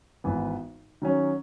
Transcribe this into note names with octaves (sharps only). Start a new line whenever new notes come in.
G#1 G#2 E3 B3
D#3 F#3 C#4